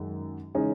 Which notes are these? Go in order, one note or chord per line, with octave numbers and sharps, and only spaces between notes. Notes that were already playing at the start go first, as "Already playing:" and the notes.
Already playing: F#2 D#3 G#3
C#3 E3 G#3 C#4 D#4